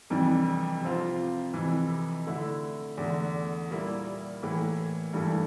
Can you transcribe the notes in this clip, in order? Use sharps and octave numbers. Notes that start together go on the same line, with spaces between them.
F2 C3 E3 G3 D4
C3 F3 C4 F4
F2 C3 E3
D3 A3 E4
E2 D3 A3
A#2 G3 A#3 E4
A2 E3 A#3
G2 E3 A3